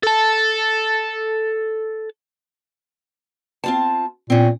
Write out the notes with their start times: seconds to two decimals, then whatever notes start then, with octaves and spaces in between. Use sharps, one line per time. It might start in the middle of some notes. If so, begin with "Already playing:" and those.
0.03 A4 A5
3.64 C4 F4 A5
4.30 A#2 C4 C#4